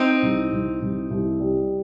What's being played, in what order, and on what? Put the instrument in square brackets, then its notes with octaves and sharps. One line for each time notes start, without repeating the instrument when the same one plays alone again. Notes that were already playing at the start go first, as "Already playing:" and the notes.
Already playing: [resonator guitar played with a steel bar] C4 D#4
[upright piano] C2
C2
C2
C2
G3